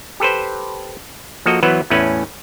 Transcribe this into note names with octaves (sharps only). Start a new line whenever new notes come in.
G4 A4 B4 C5
F3 A#3 F#4 A4 D#5
E3 F#3 B3 B4 C5
E2 A2 A3 C#4 B4 G#5